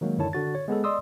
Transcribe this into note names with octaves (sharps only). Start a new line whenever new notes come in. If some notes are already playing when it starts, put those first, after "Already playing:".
D#3 F#3 G#3 A#3
F#2 D3 D#3 E4 C#5 A5
D3 F#4 A6
C#5
G#3 B3 G#4 A4
D5 D#5 C6 D#6 E6